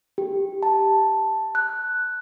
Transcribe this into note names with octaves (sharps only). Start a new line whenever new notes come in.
G4
A5
F#6